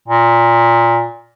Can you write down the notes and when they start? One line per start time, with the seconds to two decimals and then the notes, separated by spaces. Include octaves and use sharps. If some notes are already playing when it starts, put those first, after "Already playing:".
0.08 A#2